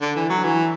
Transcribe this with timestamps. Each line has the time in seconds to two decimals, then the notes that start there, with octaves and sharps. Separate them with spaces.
0.01 D3
0.16 E3
0.30 F#3
0.44 E3